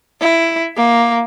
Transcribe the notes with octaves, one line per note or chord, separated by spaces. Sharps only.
E4
A#3